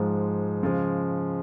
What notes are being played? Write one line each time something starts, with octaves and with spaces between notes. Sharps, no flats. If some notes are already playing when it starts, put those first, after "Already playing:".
Already playing: G#2 F3 G#3
C#3 F3 G#3